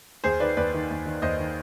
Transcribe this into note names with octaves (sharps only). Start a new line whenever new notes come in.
D#2 G#4 C5
D#3 B4 D5
D#2 B4 D5
D#3
D#2
D#3
D#2 C5 D#5
D#3